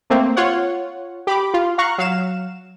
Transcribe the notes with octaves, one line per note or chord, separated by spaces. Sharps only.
A3 A#3 C4
F4 C#5 F#5
G4 B5 D6
F4
F5 A#5 C#6 F#6
F#3 F5 E7